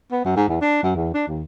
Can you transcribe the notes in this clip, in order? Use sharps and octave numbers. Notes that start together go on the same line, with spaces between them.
B3
F#2
G#2
E2
D4
F#2
E2
D4
D#2